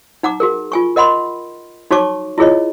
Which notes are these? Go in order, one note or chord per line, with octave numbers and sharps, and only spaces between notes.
D#4 F#5 A#5 D6
F#4 G#4 A#4
F4 G#5 C#6
A#4 D#5 F#5 B5 C6
D#4 F#4 C#5 A5 C#6 D6
E4 F4 G#4 C#5 D#5